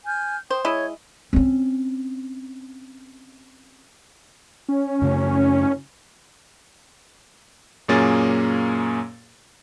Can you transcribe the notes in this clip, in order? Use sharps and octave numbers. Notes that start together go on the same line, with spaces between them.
G#5 F6 G6
C5 G5 D#6
G#3 E4 C#5 D#5
C4 C#4
C#4
F#2 C#3 A3
F#2 A#2 A#3 C#4 G#4 A6